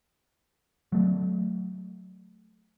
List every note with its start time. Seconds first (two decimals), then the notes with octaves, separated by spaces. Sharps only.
0.92 F#3 A3